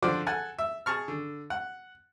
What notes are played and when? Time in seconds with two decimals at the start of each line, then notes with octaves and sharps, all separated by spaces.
0.02 D3 F3 C5 D5 F#5
0.27 A4 F#5 G#5 A5
0.59 E5
0.86 G#4 A5 C#6 F6
1.08 D3
1.50 F#5